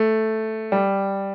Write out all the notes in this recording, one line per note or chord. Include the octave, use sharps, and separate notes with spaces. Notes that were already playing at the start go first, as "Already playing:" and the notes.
Already playing: A3
G3